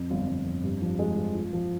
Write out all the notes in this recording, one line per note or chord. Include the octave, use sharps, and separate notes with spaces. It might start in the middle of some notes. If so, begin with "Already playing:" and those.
Already playing: F2
G1
G1
F2
G2
F3
G#3
F3
F4
F3